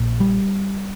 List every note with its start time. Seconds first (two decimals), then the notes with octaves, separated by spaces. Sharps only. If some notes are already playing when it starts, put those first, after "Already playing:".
Already playing: A#1 A#2
0.20 G3